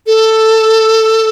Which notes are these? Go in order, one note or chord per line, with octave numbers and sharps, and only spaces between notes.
A4